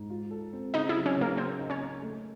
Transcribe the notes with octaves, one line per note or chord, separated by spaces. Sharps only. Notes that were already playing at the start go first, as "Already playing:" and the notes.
Already playing: G#2
F4
A4
C4
C#3 D#4 D#5
E4 E5
F#3
C#4 C#5
C#3 A#3 A#4
A#3 C4 C5
D#4
C#4 C#5
A#3
A3